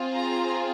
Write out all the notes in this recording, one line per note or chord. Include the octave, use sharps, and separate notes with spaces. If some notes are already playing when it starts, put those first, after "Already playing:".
Already playing: C4 F4 G#4
A#5